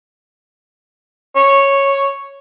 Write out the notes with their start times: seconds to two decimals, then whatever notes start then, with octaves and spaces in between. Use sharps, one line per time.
1.36 C#5